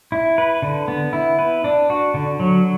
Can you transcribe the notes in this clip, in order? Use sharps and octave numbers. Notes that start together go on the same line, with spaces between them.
E4
B4
D3
B3
E4
B4
D4
F#4
D3
F#3